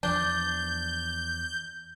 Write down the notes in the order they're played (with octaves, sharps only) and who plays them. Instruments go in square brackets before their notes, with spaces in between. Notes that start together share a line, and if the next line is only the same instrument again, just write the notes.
[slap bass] E2 E3 F3 [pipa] D4 [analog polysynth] G6